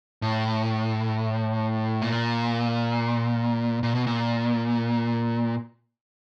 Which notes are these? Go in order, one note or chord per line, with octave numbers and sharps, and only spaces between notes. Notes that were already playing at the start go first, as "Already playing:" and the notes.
A2
A#2
A#2
B2
A#2